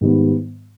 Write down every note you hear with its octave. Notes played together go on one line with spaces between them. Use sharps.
G#2 D#3 G3 B3